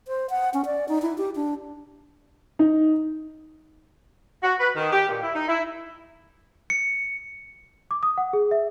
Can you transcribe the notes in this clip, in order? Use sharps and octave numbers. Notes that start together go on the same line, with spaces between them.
C5
F#5
C#4
D5
D#4
E4
G4
D4
D#4
F#4
B4
D#3
G4
A#2
E4
D#4
E4
C#7
D6
D#6
F#5
G#4
E5